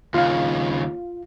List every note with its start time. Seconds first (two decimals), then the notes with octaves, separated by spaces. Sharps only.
0.14 D#2 C#3 F4 F5